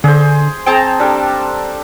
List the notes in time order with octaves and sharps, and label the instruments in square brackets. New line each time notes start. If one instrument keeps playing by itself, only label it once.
[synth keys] D3 [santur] G#4 C5
[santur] C4 G#4 [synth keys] G5 A5 A#5
[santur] G3 D4 A4